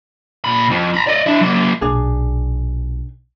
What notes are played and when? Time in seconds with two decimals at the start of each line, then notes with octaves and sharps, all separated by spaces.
0.44 A#2 B5
0.70 F2
0.94 A#5 B5
1.07 D5 D#5
1.27 D4 E4
1.41 F#3 A#3
1.81 B1 A#2 D4 G#4